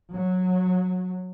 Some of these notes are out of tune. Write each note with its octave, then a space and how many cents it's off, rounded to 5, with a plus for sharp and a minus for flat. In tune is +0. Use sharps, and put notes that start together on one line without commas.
F#3 -15